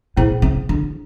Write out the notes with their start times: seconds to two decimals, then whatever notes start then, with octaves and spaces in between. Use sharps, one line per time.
0.17 A#2 C#4 E4 G#4 C5
0.42 C#3
0.69 D3